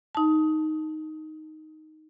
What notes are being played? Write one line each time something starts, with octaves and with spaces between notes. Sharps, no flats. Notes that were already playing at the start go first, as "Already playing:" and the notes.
D#4 A5